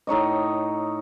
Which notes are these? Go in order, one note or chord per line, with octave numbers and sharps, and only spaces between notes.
A2 D#4 C#5 D#5